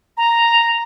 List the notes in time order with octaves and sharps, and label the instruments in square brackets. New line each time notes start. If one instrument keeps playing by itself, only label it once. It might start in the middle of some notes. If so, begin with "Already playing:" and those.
[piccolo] A#5